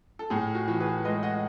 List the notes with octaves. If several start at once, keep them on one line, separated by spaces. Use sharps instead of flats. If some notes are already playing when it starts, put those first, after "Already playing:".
A4
A2 G#4
F#4
E3
G#4 B4
G#3 B4 D#5
D#5 F#5